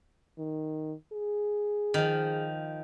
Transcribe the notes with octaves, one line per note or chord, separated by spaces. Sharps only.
D#3
G#4
D#3 F3